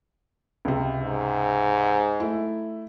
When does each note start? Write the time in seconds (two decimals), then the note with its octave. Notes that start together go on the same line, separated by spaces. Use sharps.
0.65 C#2 C3
1.02 G#2
2.20 A3 E4